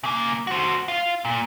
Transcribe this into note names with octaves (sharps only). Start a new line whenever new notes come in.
C#3 A#3
F#4 C5
F4 F5
A#2